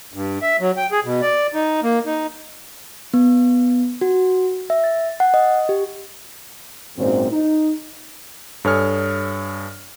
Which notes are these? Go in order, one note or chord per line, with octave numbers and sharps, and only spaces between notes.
G2
E5
F#3
G5
G#4
B2
D5
D#4
A#3
D#4
B3
F#4
E5
A6
F#5
D#5
G4
G#1 F#2 A#2 C4
D#4
G2 A4 C#5 G#5 D#6 F6